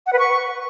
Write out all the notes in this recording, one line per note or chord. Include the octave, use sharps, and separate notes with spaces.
F#5
B4
C#6